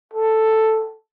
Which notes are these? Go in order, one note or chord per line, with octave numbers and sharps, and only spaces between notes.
A4